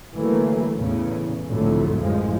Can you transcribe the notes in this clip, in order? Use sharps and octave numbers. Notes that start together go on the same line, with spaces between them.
D3 E3 F#3 A3 A#3
E2 A2 C#3
C2 F2 A2 D3 F#3 A3
A1 F#2 F3 G#3